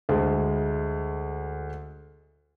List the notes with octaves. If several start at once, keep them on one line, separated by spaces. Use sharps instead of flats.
D2 G#3